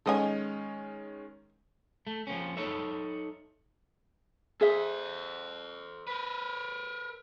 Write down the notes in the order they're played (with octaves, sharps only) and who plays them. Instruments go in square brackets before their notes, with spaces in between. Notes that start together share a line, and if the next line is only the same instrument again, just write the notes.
[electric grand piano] D#3 G#3 C#4 [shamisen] A4 D#5 G#5
[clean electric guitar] A3
F3 A#3 C4 C#4
D#4 A4 C#5 E5
[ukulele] G#4 E5 [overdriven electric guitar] A4 C5
[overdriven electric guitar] A#4 B4